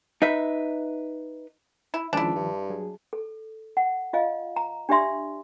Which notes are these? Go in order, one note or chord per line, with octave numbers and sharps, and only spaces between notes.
D#4 B4 E5
E4
C#2 D#3 F3 D4 E4
G2
F#3 G#4
A4
F#5
F4 D#5 F5
A#5
D4 G4 D5 E5 C6